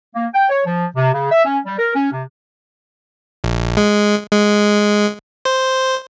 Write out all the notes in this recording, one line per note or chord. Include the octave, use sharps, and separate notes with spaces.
A#3
G5
C#5
F3
C3
C#3
E5
C#4
G3
A#4
C#4
C3
A#1
G#3
G#3
C5